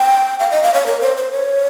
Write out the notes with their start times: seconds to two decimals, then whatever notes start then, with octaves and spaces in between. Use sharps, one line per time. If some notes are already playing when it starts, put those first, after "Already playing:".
Already playing: G5
0.40 F5
0.51 D#5
0.64 F5
0.74 C#5
0.86 A#4
1.01 C5
1.17 C5
1.32 C#5